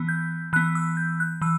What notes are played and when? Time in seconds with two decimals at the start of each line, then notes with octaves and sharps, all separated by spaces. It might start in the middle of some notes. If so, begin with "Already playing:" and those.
Already playing: E3 B3
0.08 G6
0.53 E3 F#6
0.56 B3
0.75 E6
0.97 G6
1.20 F#6
1.41 E3 E6